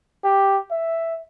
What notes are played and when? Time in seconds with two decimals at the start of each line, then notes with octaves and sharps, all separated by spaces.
0.24 G4
0.71 E5